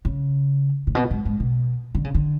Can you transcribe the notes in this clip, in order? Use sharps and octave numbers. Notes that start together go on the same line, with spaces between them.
C#3
A2
B2
G#2
G#2
B2
D3
C#3
D3